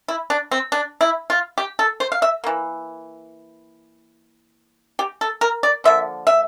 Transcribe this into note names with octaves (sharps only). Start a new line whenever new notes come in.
E4
D4
C4
D4
E4
F4
G4
A4
C5
F5
E5
E3 A#3
G4
A4
A#4
D5
D3 F3 A#3 E5
E5